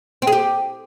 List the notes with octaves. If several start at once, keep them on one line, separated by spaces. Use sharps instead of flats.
C4
G#4
G4